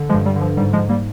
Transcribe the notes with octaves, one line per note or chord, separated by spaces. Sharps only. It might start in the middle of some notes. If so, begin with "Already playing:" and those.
Already playing: D3
F3 G#3
G2
G3
D3
F3
G#2 G3
F3 G#3
G#2
G3 A#3